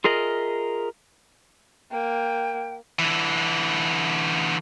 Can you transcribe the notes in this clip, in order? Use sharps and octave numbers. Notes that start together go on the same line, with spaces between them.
F4 G#4 A#4 D#5 E5
A#3 G5
D3 E3